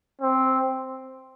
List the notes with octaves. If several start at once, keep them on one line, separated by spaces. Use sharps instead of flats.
C4